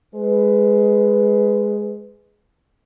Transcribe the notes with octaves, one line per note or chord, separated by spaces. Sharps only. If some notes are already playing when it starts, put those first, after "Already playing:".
G#3 B4